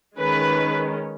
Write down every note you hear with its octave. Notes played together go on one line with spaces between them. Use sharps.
D#3 G#3 C#4 B4